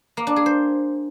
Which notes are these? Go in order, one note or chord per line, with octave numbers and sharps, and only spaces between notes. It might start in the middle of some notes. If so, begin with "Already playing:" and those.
A#3
D4
G#4
C5